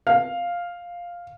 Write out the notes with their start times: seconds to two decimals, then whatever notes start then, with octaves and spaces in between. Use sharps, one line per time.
0.07 F5